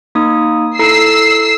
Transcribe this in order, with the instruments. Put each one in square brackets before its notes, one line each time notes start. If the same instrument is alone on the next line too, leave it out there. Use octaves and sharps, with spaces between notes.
[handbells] A#3 D#4 D#6
[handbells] E4 A4 A#5 [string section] E6 C7